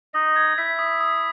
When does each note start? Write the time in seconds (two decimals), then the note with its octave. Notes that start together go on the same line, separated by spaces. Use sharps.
0.14 D#4 D#5 D#6
0.36 G#6
0.57 E4 E5 B6
0.79 D#6
1.01 D#6